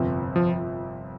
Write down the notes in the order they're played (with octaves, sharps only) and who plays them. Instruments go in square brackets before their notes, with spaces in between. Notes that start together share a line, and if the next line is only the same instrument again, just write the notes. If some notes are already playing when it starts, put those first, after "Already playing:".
Already playing: [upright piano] G1 F2 C3
[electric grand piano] F3